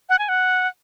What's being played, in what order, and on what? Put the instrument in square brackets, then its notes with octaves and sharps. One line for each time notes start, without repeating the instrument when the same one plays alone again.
[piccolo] F#5
G#5
F#5